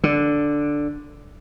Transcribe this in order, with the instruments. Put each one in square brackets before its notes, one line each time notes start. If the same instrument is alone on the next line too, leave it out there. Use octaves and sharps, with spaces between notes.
[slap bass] D3